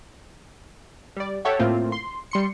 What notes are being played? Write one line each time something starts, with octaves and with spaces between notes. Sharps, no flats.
G3 D5
G4 A4 C#5 E5 F#5
A2 A3 A#3 C4 F4
C6
G3 C6 C#7